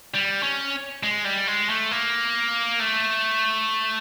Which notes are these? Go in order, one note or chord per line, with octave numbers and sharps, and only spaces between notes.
G3
C#4
G#3
G3
G#3
A3
A#3
A3